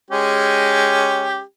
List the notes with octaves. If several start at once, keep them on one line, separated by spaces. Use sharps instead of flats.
G#3 C#4 G4